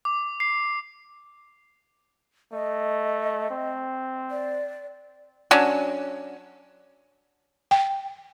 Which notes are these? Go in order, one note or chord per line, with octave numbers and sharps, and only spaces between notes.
D6
C7
A3 D#5
C4
D5
F#3 C#4 D4
G5